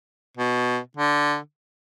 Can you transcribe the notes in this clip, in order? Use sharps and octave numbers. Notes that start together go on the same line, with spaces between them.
B2
D3